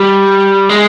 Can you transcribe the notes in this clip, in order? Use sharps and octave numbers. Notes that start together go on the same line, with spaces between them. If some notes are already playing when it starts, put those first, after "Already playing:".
Already playing: G3
G#3